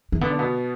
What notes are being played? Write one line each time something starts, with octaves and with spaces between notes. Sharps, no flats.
E3
D3 B3
D4
B2 B3